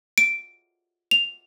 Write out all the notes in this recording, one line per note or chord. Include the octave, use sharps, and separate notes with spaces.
D7
F7